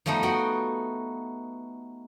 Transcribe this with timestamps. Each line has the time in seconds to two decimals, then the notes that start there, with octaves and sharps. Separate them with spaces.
0.06 F3 G3 A3 B3 D#4
0.23 B3 F#4 F#5 G5